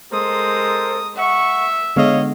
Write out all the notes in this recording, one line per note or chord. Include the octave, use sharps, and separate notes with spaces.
G#3 A4 A#4 C5 D#6
E5 F#5 C#6
D3 G#3 B3 C#5 D#5 F5